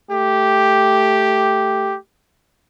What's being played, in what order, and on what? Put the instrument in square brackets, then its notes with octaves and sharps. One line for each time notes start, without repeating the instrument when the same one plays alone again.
[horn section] A3 G4